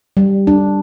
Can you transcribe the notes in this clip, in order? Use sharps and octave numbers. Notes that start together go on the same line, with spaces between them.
G3
D4